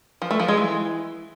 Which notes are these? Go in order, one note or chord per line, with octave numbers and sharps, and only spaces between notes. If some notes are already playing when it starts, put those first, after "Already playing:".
F3
A3
F3
G#3
E3